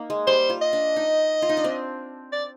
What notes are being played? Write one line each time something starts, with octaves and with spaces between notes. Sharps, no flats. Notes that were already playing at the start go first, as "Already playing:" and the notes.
Already playing: A#3 D#4
G#3
G3 C5
F4
D#5
D4
D#4
F4
D#4
D4
C4
D5